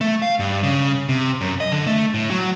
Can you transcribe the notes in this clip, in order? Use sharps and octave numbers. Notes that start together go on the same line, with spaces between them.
A3
F5
G2
C#3
C3
F#2
D#5
D3
A3
A2
F#3